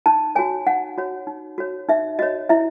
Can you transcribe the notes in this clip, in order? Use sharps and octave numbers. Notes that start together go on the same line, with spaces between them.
D#4 A5
F#4 C#5 G#5
D#4 F#5
F#4 C#5
D#4
F#4 C#5
D#4 E5
F#4 C#5 D#5
E4 E5